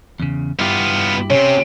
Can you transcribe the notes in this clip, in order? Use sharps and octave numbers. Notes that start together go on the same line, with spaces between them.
E2 C#3
G2 B3 E4 F4 G4
C3 C4 C#4